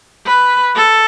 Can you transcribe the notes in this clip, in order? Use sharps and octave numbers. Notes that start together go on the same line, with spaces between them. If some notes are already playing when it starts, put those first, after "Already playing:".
B4
A4